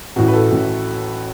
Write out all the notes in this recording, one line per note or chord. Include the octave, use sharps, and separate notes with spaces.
A1 A2 E3 F#4
B4
A4
A1 A2 E3